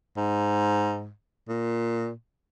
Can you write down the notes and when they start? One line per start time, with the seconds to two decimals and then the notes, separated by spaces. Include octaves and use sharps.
0.17 G#2
1.49 A#2